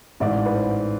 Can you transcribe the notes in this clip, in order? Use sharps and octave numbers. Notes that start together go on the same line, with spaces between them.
A1 G#2 E3 G#3 D5
B4
C5